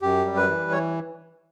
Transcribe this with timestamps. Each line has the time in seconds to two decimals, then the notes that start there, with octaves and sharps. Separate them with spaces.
0.02 F#2 G4
0.25 G3
0.36 B4
0.48 E3
0.71 C#5